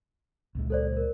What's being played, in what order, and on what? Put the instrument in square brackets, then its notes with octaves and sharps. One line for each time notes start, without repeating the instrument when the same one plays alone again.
[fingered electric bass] C#2 A#2 G#3
[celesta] A4 C5 D5
A#4